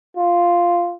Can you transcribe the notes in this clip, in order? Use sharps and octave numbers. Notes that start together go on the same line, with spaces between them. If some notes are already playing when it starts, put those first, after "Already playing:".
F4